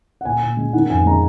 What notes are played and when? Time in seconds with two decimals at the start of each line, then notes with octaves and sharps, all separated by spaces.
0.21 F#5
0.25 A#2 G#5
0.42 A#2
0.57 G#3
0.73 D#3 F#5
0.90 F2 G#5
1.06 G#3 A#5